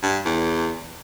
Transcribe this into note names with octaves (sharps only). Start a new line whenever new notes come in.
G2
E2